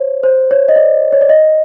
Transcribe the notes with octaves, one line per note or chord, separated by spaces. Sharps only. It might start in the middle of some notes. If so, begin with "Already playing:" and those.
Already playing: C5 C#5
C5
C#5
D#5
D5
C#5
D5
D#5